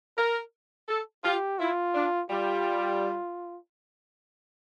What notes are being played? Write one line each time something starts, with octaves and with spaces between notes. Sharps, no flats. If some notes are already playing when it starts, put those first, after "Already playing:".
A#4
A4
F4 G4
E4 F4
D4
G3 F4